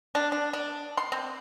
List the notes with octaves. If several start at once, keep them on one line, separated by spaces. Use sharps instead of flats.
D4
D4
D4
C6
C4